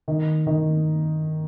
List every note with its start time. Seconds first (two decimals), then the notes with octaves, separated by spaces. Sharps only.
0.08 D#3
0.47 D#3